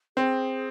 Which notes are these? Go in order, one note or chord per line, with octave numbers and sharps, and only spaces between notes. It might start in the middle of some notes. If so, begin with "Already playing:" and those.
C4 G#4